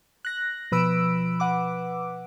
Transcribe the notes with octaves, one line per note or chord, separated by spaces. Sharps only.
F#6 A#6
B2 F3 B4 B5 E6 D7
B4 F#5 D6